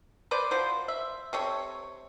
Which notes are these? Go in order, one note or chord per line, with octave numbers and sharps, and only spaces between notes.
B4 C5 D5
F3 F#3 C5
E5
C3 A4 C#5